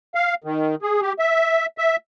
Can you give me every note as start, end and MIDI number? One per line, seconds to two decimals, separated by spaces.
0.15 0.34 77
0.44 0.75 51
0.82 1.01 68
1.02 1.13 67
1.19 1.66 76
1.78 1.96 76